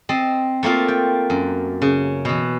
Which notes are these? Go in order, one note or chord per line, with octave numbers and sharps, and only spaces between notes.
C4 D#5 A5
A3 A#3 C4 F4
G5
F#2
C#3
B2 E3